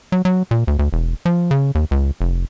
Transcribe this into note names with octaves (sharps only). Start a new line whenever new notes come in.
F#3
F#3
A#2
D2
D2
E1
F3
C#3
D#2
C#2
F1